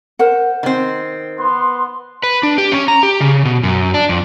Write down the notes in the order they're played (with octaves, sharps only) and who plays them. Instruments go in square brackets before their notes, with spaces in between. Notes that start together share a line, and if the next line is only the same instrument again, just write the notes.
[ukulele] A#4 C5 F#5
[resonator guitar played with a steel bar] D#3 C4
[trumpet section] B3 C6
[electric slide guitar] B4
D4
G4
C#4
A#5
G4
C#3
B2
F#2
D4
F2